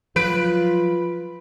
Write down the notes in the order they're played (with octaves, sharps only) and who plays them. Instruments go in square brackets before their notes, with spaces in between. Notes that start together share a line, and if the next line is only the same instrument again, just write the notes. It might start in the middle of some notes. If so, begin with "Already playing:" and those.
[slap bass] F3 F#3 [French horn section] F4 [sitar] B4 [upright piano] D7